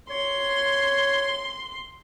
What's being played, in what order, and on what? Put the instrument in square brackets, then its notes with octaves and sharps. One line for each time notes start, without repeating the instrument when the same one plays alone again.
[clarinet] C#5 [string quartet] C6